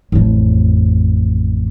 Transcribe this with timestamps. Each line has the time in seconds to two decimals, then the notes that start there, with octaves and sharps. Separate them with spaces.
0.12 A1 F2